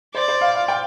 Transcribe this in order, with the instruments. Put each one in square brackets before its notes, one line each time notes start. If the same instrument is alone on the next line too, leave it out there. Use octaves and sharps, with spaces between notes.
[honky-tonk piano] C5 [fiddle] D5
[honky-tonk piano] C5
F5
F5
G5